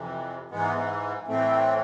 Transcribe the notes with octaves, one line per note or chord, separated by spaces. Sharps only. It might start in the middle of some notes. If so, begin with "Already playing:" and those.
Already playing: F2 C3 E3
G#2 E3 G#3 B3
A2 E3 A3 C4